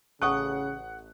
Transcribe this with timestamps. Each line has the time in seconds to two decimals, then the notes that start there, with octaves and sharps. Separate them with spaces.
0.22 A1 C#3 F#5 A5 C#6 D#6 F#6